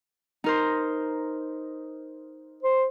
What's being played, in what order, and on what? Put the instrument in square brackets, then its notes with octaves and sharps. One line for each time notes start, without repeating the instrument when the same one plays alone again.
[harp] D#4 A#4 C5
[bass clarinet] C5